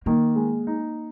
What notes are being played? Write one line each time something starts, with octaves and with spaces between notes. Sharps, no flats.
D#3 A#3
G#3
D#4